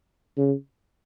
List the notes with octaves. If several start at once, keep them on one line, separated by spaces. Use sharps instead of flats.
C#3